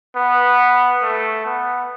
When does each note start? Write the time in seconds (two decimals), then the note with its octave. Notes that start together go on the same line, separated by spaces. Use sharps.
0.16 B3
1.02 A3
1.45 B3